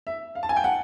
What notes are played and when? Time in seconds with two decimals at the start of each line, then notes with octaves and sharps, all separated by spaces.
0.07 E5
0.35 F5
0.43 A5
0.49 G#5
0.56 G5
0.64 F#5